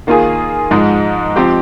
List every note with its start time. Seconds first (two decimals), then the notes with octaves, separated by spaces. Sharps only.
0.07 D#3 A#3 F4 G#4
0.71 G#2 F3 G#3 D#4
1.36 F3 C4 G4